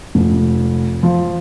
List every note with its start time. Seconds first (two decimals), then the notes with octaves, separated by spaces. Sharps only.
0.15 F1
1.03 F3